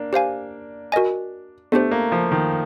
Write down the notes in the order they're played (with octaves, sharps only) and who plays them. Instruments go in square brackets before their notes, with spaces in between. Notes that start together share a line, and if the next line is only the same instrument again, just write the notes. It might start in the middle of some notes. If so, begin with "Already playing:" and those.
Already playing: [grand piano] A#3 D4
[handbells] G4 C5 F5 G#5
F#4 A#4 D#5 G#5
[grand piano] A3 [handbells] B3 D4 G4 C5
[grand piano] A#3
F3
D#3